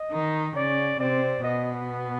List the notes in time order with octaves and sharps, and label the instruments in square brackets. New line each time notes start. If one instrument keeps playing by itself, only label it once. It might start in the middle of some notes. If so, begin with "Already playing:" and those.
Already playing: [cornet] D#5
[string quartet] D#3 D#4
[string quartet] C#3 C#4 [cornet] D5
[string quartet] C3 C4 [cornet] D5
[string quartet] B2 B3 [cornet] D#5